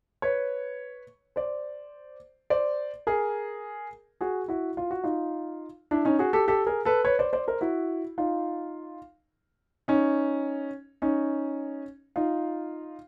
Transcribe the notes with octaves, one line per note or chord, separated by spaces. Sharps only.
B4 C#5
C5 D5
C5 D5
G#4 A#4
F#4 G#4
E4 F#4
F4
F#4
D#4 F4
D4 E4
C#4 D#4
F#4 G#4
G4 A4
G4 A4
G#4 A#4
A4 B4
B4 C#5
C5 D5
C5 D5
A#4 C5
E4 F#4
D#4 F4
C#4 D#4
C#4 D#4
D#4 F4